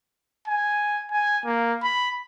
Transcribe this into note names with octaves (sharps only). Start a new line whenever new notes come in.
G#5
G#5
A#3
B5